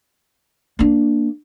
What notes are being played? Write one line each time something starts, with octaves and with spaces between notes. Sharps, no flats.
A#3 D4